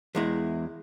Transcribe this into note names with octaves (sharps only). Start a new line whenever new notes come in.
E2 G#3 E4